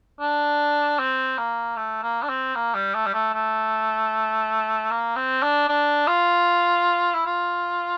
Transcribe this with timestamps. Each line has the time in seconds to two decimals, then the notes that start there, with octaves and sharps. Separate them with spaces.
0.20 D4
0.99 C4
1.38 A#3
1.77 A3
2.03 A#3
2.23 D4
2.29 C4
2.55 A#3
2.75 G3
2.95 A3
3.06 G3
3.14 A3
3.34 A3
4.91 A#3
5.16 C4
5.43 D4
5.68 D4
6.08 F4
7.14 E4
7.26 F4